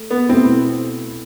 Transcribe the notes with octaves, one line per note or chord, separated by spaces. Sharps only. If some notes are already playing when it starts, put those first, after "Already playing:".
Already playing: A3 A4
B3
B2 A3 C4 E4